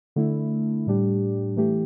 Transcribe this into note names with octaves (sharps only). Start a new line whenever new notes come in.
D3 A3 E4
A2 G3 D4 G4
E3 A3 G4